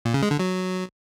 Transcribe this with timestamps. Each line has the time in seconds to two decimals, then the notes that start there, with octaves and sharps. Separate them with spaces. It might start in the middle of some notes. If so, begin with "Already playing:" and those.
0.05 A#2
0.14 C#3
0.22 G#3
0.31 D3
0.39 F#3